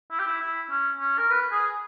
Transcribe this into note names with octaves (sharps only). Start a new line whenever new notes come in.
E4
G4
E4
E4
C#4
C#4
A#4
B4
G#4